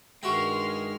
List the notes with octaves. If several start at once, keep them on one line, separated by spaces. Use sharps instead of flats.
G2 D#3 G#3 F#4 E5 G5 C6 F6